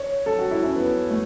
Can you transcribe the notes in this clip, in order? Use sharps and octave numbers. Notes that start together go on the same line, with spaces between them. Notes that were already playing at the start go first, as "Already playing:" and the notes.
Already playing: C#5
A4
F#4
E4
C#4
B3
A3